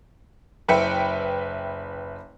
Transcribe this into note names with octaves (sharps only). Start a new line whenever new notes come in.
F#1 B4 E5 G5 C#7